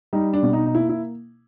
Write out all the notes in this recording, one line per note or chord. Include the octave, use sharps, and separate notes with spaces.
G3 D#4
D4
B2
D#4
D#4
A#3 E4
E4